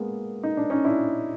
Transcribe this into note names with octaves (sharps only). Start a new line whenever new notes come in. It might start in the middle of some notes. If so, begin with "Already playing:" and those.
Already playing: G#3 A#3 B3
D#4
D4
C#4 D#4
D4 E4